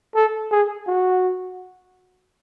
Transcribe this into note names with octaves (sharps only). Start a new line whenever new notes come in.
A4
G#4
F#4